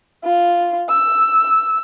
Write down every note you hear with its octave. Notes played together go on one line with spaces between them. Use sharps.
F4
E6